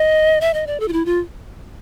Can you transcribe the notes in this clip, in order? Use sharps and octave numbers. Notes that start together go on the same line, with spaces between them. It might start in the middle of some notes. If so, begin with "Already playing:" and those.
Already playing: D#5
E5
D#5
D5
A4
F4
E4
F4